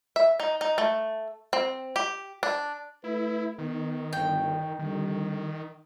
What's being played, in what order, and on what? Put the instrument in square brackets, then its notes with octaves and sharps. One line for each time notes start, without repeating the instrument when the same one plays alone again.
[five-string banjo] E5
D#4
D#4
A3
C4
G4
D4
[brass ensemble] A3 B4 [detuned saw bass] E4
[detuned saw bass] D#3 [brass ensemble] B3 D#4
[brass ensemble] G1 [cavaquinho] G5
[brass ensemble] F2 D3 G3 [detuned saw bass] D#3